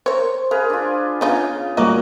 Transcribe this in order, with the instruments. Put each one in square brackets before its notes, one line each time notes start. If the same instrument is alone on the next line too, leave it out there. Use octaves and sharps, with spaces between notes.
[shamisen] A#4 C#5 [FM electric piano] C5
[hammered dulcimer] G#4 B4 F5 [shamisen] A#4
[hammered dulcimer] D4 F4
[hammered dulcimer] C#3 [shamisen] B3 D#4 F4
[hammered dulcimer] A#2 F#4 D6 [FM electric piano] G3 A#3 A#4 [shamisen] D#5